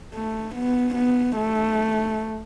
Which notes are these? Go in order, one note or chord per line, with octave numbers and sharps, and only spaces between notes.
A3
B3
B3
A3